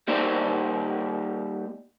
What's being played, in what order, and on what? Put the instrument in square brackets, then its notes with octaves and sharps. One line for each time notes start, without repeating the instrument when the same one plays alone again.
[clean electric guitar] G3 A#3 D#4 C5 D5